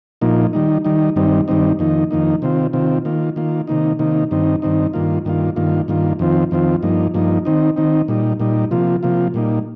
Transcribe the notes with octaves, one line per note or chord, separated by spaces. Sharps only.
A#2 F3 A#3 D#4
D#3 G3 D#4
D#3 G3 D#4
G2 D#3 G3 C4 D#4
G2 D#3 G3 C4 D#4
F2 D#3 A#3 D#4
F2 D#3 A#3 D#4
C3 D#3 C4 F4
C3 D#3 C4 F4
D#3 A#3 F4
D#3 A#3 F4
C3 D#3 A#3 D#4
C3 D#3 A#3 D#4
G2 D#3 C4 D#4
G2 D#3 C4 D#4
G2 D#3 A#3 F4
G2 D#3 A#3 F4
G2 D#3 A#3 F4
G2 D#3 A#3 F4
F2 D#3 C4 F4
F2 D#3 C4 F4
G2 F3 A#3 D#4
G2 F3 A#3 D#4
D#3 C4 D#4
D#3 C4 D#4
A#2 G3 D#4
A#2 G3 D#4
C3 F3 A#3 F4
C3 F3 A#3 F4
A#2 G3 A#3 D#4